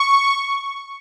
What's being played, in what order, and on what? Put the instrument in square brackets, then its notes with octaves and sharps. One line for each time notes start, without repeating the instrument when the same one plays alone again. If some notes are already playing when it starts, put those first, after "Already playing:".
Already playing: [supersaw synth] C#6